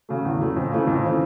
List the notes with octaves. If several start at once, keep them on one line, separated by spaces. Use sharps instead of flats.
C#3 F#3 A3
E2
C#3 F#3 A3
F2
C#3 E3 A3
F2
C#3 E3 A3